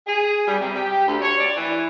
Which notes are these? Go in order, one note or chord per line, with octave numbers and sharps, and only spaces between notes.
G#4
G3
C3
G4
D2
C#5
D5
E3